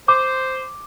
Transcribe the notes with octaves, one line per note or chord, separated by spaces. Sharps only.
C5 D6